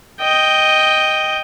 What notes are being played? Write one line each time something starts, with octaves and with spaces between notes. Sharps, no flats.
D#5 G5